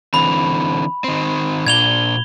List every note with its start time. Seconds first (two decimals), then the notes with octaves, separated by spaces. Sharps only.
0.14 D3 E3 C4 B5
1.04 D#3 C4
1.67 A#2 D4 G#6 F7 G7